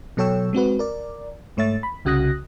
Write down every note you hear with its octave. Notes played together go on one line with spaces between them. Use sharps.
B2 F#3 A4 C#5 G5 E6
G#3 C4 F#4 B4
A#4 D5
G#2 A3 C#5 E5 A6
B5
C2 C#3 F#4 D#6 F#6 A#6